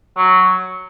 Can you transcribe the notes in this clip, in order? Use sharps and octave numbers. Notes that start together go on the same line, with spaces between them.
F#3